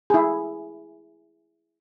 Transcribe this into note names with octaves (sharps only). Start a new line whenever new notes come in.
E4 G#4